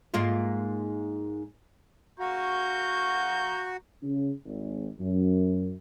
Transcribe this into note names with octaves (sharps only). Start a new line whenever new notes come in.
G#2 A#3 F4
F#4 F5 A#5 C#6 G6
C#3
G#1
F#2